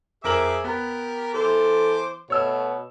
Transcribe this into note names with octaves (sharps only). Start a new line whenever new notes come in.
F2 G#4 A#4 E5 D6 F#7
B3 G4 A#4
E3 A4 C5 D6
B2 A3 C#5 E6